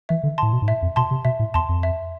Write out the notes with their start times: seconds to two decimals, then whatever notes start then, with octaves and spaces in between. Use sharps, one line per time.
0.09 E3 E5
0.23 D3
0.38 A2 A5 C6
0.53 B2
0.62 G#2
0.68 A2 E5
0.82 F2
0.96 B2 A5 C6
1.11 C3
1.25 B2 E5
1.39 A2
1.54 E2 A5 C6
1.69 F2
1.83 E5